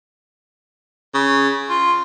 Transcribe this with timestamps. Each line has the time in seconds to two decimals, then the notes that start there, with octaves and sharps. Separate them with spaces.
1.14 C#3
1.69 F4